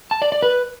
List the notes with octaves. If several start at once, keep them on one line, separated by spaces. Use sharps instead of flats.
A5
D5
D5
B4